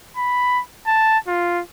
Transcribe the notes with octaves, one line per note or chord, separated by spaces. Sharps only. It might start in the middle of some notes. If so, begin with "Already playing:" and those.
B5
A5
F4